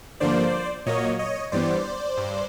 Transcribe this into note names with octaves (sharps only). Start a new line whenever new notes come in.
G2 D3 F3 A#3 C5 D5
A#2 F#3 A#3 C#5 D#5
C#5 D#5
G2 E3 G3 B3 C5 D5
G2